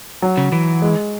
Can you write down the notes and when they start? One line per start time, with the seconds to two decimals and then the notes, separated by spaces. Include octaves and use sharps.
0.22 F#3
0.37 C#3
0.52 E3
0.82 G#3